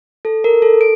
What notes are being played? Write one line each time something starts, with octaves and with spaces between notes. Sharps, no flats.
A4
A#4
A4
D7